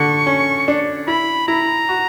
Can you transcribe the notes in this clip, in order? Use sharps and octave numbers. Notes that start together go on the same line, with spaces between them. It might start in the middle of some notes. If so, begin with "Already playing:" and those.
Already playing: D3 C#6
C#4
D4
E4 B5
E4 A#5
F#4